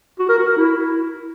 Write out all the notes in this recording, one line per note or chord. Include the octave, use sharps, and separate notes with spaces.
F#4
A#4
F#4
A#4
E4